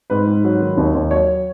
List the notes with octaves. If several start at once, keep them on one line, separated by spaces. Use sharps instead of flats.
G#2 B4
G#2
F#3
D#3
D#2
D#2
F#3 C#5